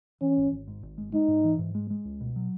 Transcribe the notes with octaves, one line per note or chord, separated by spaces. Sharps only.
E3 C#4
G#1
G#1
G#2
G#1
G#3
G#3 D#4
G#2
E3
G#2
G#3
G#3
C#2
B2
F#3